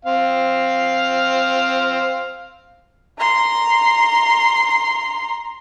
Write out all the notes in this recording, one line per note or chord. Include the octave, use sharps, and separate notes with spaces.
C4 F5
A#5 C6